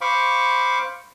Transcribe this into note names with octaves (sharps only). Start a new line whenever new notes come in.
C5 F5 B5 C#6 D6